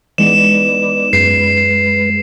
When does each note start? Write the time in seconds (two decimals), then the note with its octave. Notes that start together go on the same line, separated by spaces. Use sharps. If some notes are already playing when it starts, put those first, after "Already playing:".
0.18 E3 G#3 B3 D#4 B4 D5 E7
1.13 F#2 G#3 B4 C7